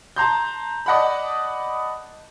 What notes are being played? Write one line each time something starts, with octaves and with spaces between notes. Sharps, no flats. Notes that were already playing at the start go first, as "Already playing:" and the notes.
A5 A#5 C6 G6
D5 D#5 F#5 A5 B5